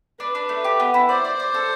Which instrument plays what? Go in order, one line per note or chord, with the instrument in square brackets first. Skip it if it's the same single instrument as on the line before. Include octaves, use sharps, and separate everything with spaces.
[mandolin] D4 [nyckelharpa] B4
[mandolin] D4
A3
G4
B3
E4
[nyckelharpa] C5 [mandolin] D5
[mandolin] D5
D5
A4